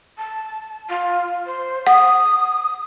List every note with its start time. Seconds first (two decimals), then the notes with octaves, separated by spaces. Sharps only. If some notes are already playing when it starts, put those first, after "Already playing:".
0.18 A5
0.89 F4
1.46 C5
1.87 F#5 D#6